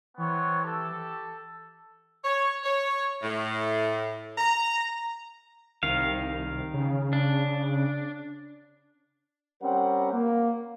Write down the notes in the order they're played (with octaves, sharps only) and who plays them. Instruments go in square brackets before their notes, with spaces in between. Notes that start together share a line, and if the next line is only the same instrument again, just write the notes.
[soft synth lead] E3 [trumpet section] B3 C4 C#5
[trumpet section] G4 A4
[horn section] C#5
C#5
A2
A#5
[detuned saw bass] C2 [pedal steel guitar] D#3 F5
[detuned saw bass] C#3
[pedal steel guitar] D4
[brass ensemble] G3 C4 C#4 A#4 F#5
A#3